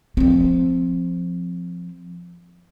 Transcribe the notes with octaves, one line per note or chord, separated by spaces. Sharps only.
F3 C4